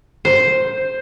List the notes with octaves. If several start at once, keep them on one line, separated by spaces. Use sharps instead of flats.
C5